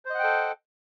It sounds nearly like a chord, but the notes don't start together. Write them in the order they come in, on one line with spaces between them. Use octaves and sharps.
C5 D#5 F#5 G5 A4